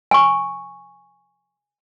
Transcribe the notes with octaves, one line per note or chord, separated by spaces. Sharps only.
G#5 C#6